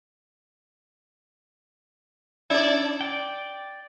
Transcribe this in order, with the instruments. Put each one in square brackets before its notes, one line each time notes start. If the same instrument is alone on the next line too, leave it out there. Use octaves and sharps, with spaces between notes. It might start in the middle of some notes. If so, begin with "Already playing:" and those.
[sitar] C#4 D5 [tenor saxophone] E4
[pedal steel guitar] D5 G5